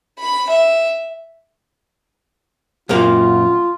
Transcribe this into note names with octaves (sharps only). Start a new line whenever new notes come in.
B5
E5
F#2 A#2 A#3 F4